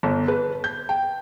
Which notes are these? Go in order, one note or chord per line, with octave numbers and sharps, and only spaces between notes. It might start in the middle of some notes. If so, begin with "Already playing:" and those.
G1
B4
G6
G5